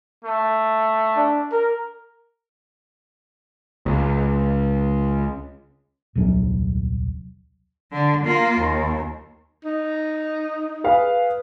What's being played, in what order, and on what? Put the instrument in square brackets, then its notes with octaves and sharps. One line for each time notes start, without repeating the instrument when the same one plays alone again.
[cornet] A3
[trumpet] D4
A#4
[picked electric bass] C#2
[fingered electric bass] D#1 C2 F#3 C#4
[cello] D3
A#3 F4
D#2
[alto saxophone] D#4
[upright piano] G#4 B4 F5